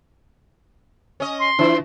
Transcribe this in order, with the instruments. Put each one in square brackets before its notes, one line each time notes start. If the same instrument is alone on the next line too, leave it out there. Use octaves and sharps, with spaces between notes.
[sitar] C#4 D#5
[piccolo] C6
[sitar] E3 [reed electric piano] D4 E4 F4